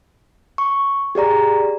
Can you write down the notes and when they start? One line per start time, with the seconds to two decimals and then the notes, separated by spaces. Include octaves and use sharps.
0.58 C#6
1.15 G4 G#4 D5 A#5